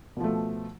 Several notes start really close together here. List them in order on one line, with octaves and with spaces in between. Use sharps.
B2 F3 A3